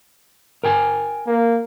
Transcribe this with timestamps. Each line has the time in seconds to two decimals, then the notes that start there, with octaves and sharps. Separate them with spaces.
0.64 A#4 G5 G#5
1.26 A#3